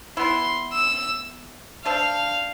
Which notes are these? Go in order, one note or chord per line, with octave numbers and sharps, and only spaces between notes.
E3 B3 E4 C6
E6
A3 D4 A4 C5 F5